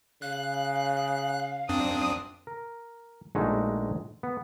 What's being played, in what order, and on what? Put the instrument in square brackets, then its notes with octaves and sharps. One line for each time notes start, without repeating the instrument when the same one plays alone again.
[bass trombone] C#3 [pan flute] F5 [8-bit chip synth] F#6
[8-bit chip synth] F#2 C4 D4 [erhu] D#6
[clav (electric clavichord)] A#4
A#1 G#3 A3 D#4 F#4
B3